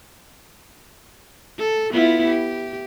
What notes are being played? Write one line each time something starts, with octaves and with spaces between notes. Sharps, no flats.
A4
B3 E4 F4
G4